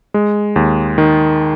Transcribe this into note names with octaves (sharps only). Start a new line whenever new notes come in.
G#3
D#2
D#3